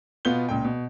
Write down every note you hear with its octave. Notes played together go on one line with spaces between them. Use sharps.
B2 B3 F4 G6 G7
C#2 A#2 G5
B2